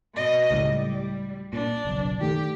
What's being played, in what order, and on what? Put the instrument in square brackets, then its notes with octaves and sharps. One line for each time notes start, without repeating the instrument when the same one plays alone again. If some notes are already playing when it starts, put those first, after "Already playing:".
[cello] B2 D#5
[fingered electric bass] C#2 A2 [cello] G3
[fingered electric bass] A#2 [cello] D4
[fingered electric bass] F#1 B1
[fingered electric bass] D#3 A3 [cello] G4